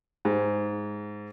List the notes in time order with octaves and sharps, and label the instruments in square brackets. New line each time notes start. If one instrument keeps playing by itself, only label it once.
[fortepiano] G#2